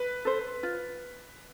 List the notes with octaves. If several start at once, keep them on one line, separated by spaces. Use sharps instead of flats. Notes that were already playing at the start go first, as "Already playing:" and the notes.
Already playing: B4
A4 C5
F4